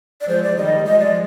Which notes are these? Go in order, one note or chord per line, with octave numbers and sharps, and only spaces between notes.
D5
F3 G#3 C5
D5
D#3 G3 D#5
F3 G#3 D#5
D5